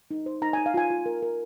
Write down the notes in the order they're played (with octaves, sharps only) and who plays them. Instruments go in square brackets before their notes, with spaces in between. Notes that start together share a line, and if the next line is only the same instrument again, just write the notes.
[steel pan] D#4
C5
D#4 A#5
D#4 G#5
F5
F4 G#5
F4
A#4
A#4